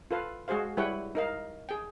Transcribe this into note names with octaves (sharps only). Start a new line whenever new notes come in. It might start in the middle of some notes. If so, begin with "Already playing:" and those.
F4 A4 B4 F5
G#3 F#4 G#4 C5 F5
G3 E4 B4 C#5 F#5 G5
D#4 A#4 F5
G#4 G5